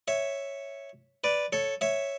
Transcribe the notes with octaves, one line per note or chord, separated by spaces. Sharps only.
C#5 E5
B4 D5
A4 C#5
C#5 E5